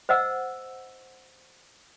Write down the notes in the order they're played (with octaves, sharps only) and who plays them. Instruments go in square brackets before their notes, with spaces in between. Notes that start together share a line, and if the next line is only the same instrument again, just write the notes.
[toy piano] C5 D#5 F#5 E6